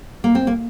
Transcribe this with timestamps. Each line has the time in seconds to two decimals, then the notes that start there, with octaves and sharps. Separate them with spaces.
0.24 A#3
0.35 C4
0.47 A#3